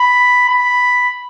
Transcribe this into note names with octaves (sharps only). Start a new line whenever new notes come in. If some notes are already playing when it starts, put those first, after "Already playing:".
Already playing: B5
B5